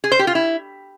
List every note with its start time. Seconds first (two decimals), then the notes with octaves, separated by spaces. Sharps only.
0.04 G#4
0.12 C5
0.19 G4
0.27 F4
0.35 E4